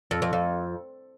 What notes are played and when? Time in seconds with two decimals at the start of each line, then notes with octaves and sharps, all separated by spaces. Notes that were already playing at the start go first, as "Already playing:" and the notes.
0.11 F2
0.22 F2
0.33 F2